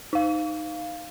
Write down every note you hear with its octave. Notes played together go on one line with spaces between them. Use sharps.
D#4 F5